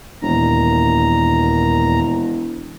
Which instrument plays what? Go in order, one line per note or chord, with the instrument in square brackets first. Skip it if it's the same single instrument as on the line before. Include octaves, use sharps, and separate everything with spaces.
[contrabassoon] E1 [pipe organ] D#2 A#2 A#5